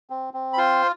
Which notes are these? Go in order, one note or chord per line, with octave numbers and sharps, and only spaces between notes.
C4
C4
B5
F4 C5 C6